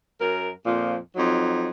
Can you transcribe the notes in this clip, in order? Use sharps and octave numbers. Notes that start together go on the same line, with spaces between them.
F#2 A#4
F2 A#2 F3
F2 F#3 D#4